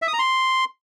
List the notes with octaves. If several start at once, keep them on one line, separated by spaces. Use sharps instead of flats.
E5
D#6
A#5
C6